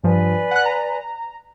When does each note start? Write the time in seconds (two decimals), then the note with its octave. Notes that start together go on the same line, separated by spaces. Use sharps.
0.04 G2 F3 B4 D5 G#5
0.51 F#5 F#6
0.65 A#5